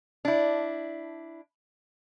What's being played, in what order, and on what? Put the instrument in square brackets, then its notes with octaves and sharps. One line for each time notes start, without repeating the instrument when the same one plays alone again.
[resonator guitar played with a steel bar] D4 E4